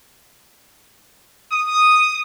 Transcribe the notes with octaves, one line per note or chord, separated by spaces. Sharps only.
D#6